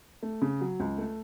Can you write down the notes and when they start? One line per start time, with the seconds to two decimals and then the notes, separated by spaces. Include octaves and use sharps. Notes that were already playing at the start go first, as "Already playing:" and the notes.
0.23 A3
0.42 C#3
0.61 F#3
0.80 C#2
0.98 A3